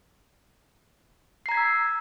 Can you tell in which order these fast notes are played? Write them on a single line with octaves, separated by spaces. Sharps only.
C7 A#5 G#6 B6 E6